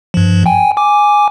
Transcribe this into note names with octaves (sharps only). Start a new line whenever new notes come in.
G2 F3
G5 G#5
G#5 D6